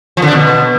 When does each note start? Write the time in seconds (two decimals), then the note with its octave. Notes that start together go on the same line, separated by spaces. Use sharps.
0.17 F3
0.22 D3
0.27 D4
0.33 B2